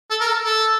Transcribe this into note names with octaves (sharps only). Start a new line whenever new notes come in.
A4
A#4
A4
A4